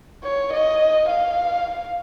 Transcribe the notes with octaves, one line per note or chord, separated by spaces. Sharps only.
C#5
D#5
F5